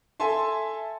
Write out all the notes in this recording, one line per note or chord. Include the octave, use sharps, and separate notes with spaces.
A4 E5 G#5 A5 C6